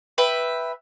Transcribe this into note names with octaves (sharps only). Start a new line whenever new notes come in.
B4 E5 G5